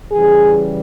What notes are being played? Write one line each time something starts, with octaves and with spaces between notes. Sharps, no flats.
C#3 E3 G3 G#4